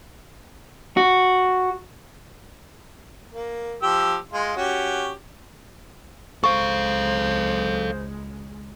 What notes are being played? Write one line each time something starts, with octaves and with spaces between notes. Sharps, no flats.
F#4
A#3
F3 G4 E6
G#3 F4
C#4 F#4 G4
C#2 G#3 A4 C5 F5 C#6